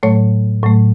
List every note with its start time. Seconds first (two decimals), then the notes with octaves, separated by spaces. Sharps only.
0.03 A2 F#3 A3 C#5
0.63 A2 F#3 A3